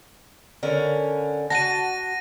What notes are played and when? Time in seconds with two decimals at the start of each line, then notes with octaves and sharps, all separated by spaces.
0.63 D3 C#4 A#4
1.50 F#4 A5 A#6 D#7